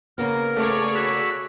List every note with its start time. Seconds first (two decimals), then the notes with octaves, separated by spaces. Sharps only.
0.18 C#3 A#3 B3 A#4
0.56 A3 G#4 C#5 D5
0.95 F#4 B5 E6